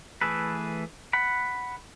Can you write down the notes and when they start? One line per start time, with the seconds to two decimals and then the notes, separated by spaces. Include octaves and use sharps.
0.21 E3 A3 G#4 A4 B4
1.13 F#5 B5